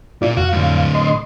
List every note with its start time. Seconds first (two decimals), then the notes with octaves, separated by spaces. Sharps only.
0.22 A#2 E4 F4 D5
0.37 F2 F#4 F5
0.52 A2 D3
0.95 D#5 C6